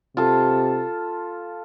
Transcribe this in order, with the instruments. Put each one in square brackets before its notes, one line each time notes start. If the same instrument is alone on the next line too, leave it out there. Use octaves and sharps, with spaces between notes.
[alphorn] C3 [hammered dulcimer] F4 A4